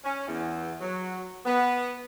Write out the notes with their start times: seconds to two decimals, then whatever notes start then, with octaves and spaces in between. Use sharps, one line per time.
0.04 C#4
0.27 E2
0.81 F#3
1.46 B3